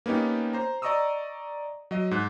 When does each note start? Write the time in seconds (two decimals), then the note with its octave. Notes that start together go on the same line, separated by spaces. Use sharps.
0.06 A#3 B3 C#4 D#4 G4
0.53 C5 A#5
0.82 D5 D#5 A#5 C#6 D#6 E6
1.91 F#3 D#5
2.11 G#2 F#6